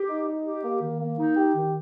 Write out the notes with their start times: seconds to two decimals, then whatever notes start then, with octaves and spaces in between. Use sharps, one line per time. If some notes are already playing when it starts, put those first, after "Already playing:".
Already playing: G4
0.09 D#4
0.27 D#4
0.45 G4
0.64 A#3
0.82 D#3
1.00 A#3
1.19 D#4
1.37 G4
1.55 D#3